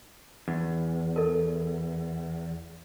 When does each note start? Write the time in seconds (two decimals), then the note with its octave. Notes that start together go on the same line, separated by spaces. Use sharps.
0.48 E2
1.16 A4 A#4